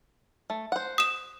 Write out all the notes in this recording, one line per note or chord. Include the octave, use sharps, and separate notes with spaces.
A3
C5 F#5
D#6 E7